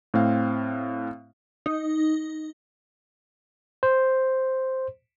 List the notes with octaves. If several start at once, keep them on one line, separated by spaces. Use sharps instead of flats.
A2 C4 F5
D#4
C5